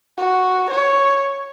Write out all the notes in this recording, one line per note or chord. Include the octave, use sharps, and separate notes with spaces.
F#4
C#5